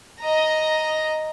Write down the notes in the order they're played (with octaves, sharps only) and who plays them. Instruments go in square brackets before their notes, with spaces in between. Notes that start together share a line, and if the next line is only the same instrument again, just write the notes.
[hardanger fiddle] D#5 A#5